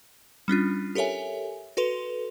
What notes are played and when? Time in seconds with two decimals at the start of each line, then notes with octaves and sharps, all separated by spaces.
0.48 G3 C#4 D4 F4
0.95 G4 A4 A#4 C#5 E5 G#5
1.77 F#4 A4 B4 C6 F7